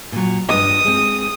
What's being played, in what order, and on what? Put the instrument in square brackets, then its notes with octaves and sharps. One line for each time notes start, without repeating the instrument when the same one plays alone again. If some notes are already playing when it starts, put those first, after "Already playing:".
[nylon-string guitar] A#2 F#3
[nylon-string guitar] G2 D4 D#5 [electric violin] D#6
[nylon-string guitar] G#3 C4